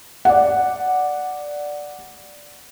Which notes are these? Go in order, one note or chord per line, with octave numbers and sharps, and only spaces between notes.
D5 F#5